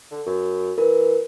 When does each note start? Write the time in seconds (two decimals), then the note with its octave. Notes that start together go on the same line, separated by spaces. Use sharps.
0.11 D3
0.26 F#2
0.78 E3 A#4